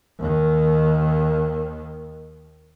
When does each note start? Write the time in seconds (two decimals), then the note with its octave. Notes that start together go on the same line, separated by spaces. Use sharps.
0.18 D#2 D#3